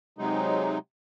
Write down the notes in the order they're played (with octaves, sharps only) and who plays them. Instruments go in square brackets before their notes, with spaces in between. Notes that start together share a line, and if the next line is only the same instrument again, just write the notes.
[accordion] C3 F#3 G#3 D#4